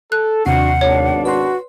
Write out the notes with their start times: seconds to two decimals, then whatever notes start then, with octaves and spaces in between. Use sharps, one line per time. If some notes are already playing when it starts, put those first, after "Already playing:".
0.12 A4 F#6
0.46 D#2 C3 D4 F#4 F#5 C7
0.81 G#1 B2 D4 C#5
1.25 F#4 B4 C6